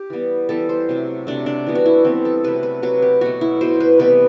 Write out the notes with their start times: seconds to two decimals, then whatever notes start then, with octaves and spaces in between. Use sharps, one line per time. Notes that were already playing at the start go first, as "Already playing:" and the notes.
Already playing: G4
0.10 E3 G3 B3
0.49 E3 G3 B3 A4
0.69 C5
0.89 C3 F#3 A3
1.27 C3 F#3 A3 D4
1.46 D4
1.66 E3 G3 B3
1.75 F#4
1.86 E4
2.04 E3 G3 B3 C4
2.25 A4
2.44 C3 F#3 A3 B4
2.63 B4
2.82 C3 F#3 A3 B4
3.02 G4
3.21 B2 F#3 A3 F#4
3.41 E4
3.61 B2 F#3 A3 C5
3.80 B4
3.99 C3 E3 G3 B3 B4